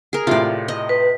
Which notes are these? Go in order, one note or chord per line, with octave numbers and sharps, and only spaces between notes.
G#4 A#4
A2 C3 F4 D5
D#5
B4